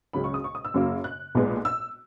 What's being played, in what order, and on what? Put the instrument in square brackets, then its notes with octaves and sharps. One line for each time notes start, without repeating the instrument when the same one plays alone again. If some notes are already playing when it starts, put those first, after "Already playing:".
[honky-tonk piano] C#2 C#3 F#3 B5
C#6
D#6
C#6
D#6
E6
F#2 C#3 F#3 A#3
F#6
B1 A#2 G#3 B3
E6